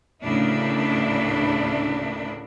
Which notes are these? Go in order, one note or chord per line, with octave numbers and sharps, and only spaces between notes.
D2 A2 C#3 A#3 D4 E4